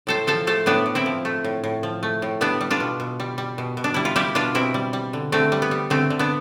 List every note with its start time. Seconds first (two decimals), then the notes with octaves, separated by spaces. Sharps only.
0.07 A2 A4 C5
0.27 F3 A4 C5
0.47 A3 A4 C5
0.66 A2 B3 D4
0.86 A2
0.95 C4 E4
1.06 F3
1.25 A3
1.44 A2
1.64 A2
1.83 F3
2.03 A3
2.22 A2
2.41 G3 B3 D4
2.61 G3
2.71 D4 F4
2.80 B2
3.00 B2
3.20 G3
3.38 G3
3.58 B2
3.77 B2
3.84 D4
3.94 G3 E4
4.05 F4
4.16 G3 E4 G4
4.35 B2 D4 F4
4.55 B2 C4 E4
4.74 G3
4.93 G3
5.13 D3
5.32 D3 A3 C4
5.52 G3
5.62 B3
5.71 G3
5.90 D3 A3 C4
6.10 D3
6.19 B3 D4